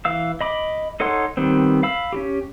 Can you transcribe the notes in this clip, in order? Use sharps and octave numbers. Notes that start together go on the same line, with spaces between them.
E3 F5 E6
D#5 B5 D6
D#4 A4 C#5 F#5 C6
D#3 G3 B3 C4
F5 B5 E6
C#4 F#4 G4